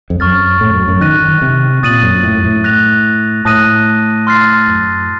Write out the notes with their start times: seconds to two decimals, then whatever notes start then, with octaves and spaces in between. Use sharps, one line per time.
0.10 F2
0.20 F#2 C#6 F6 A6
0.61 A2
0.74 F#2
0.88 F#2
1.01 D#3 F#6 A#6 D#7
1.28 D#3
1.42 C3
1.83 A#2 D#6 A6 D#7 F#7
2.03 F#2
2.23 A2
2.35 F#2
2.44 A2
2.64 F#6 A#6 F7
3.45 A2 A5 D#6 F#6 A#6 D#7
4.27 C6 F6 A6 C7
4.68 F#2